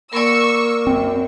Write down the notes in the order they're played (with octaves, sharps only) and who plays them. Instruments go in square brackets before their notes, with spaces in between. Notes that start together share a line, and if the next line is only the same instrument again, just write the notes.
[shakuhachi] A#3 [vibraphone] A#4 D5 [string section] C#6 E6
[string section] F#2 [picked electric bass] C4